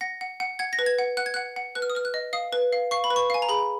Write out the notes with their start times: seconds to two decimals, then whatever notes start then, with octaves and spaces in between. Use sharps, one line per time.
0.01 F#5 A#6
0.21 F#5
0.40 F#5
0.59 F#5 G#6
0.73 A#6
0.79 B4
0.86 G#6
0.99 F#5
1.17 F#5 F#6
1.26 G#6
1.34 F#5 F#6
1.56 F#5
1.75 B4 F#6
1.82 F6
1.90 D#6
1.95 B4 F6
2.05 F#6
2.14 D#5
2.33 F5 D#6
2.53 B4
2.73 F5
2.91 F5 C#6
3.04 B5
3.10 B4
3.16 C#6
3.30 F5 G#5
3.42 A#5
3.49 G#4 B5